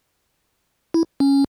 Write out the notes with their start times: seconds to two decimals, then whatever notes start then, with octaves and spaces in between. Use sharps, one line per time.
0.94 E4
1.20 C#4